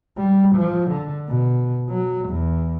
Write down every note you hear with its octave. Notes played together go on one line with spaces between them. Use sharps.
G3
F3
D3
B2
F#3
E2